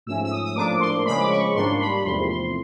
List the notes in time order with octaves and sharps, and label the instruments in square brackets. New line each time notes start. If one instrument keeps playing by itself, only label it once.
[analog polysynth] G#2 F3 A3 C#4 E6
E6
D#6
D#6
A2 F3 A#3 D4 D6
C6
C#3 F3 G#3 C#4 B5
D6
C#6
G#2 D#3 G3 A#3 D4 C6
B5
B5
E2 C3 F3 A3 C4 C6
C6